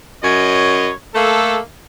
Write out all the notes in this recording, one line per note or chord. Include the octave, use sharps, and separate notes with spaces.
F#2 C#5 D#5
A3 A#3 A4